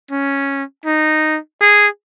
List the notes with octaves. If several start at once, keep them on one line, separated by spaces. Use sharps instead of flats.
C#4
D#4
G#4